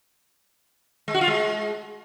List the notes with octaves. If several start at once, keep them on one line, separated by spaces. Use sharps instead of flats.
G#3
F#4
F4
G#3